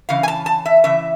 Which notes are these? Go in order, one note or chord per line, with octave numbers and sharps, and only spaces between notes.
C#3 E3 F5
G#5
A5
A5
E5
C#3 E3 E5